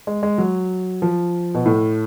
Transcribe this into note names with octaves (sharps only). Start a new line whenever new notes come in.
G#3
G#3
F#3
F3
B2
A2